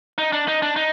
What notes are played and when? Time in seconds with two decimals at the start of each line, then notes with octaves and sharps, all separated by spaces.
0.18 D#4
0.32 D4
0.48 D#4
0.62 D4
0.76 D#4